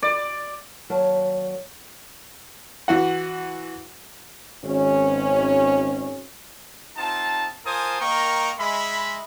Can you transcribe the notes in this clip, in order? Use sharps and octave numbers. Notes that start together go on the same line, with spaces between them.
D5
D#2 F#3 A#4 D5 A5
E3 F#4 F#5
G#1 C#4
C4 D#4 F4 A5
F4 A#4 C5 G#5 A5 D#6
A#3 A#4 D#5 G5 A#5 C#6
G#3 E5 B5